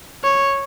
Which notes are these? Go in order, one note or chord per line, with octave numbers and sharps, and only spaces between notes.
C#5